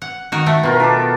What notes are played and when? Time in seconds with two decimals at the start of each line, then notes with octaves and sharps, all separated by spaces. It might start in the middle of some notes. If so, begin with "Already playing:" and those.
0.02 F#5
0.32 D#3 F#4
0.46 A3
0.63 B2 B3 F4 A#4
0.80 D#3 A4 D6